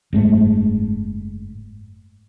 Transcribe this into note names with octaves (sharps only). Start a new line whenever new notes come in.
F#1 G#2 A3